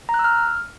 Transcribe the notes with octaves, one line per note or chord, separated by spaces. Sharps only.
A#5
F#6
E6
F6